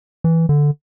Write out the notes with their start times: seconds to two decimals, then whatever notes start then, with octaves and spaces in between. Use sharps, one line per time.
0.24 E3
0.49 D3